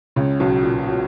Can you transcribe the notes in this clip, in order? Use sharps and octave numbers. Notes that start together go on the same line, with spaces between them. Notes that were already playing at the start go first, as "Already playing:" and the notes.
C#2 C#3
B1 B2
A#2
B2